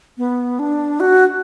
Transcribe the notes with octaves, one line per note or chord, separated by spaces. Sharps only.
B3
D4
F#4